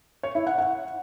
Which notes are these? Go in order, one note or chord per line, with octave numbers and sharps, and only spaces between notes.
C#5
E4
F#5
F#5